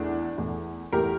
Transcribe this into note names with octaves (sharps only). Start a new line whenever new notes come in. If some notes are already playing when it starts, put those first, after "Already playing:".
Already playing: E2 E3 A3 D4
E2 E3 A3
E2 E3 A3 G4 A#4